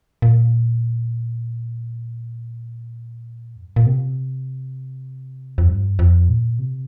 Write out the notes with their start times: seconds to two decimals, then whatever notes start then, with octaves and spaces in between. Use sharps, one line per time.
0.22 A#2
3.56 F2
3.65 G2
3.76 A#2
3.86 C3
5.58 F2
5.68 G2
5.99 F2
6.29 A#2
6.59 C3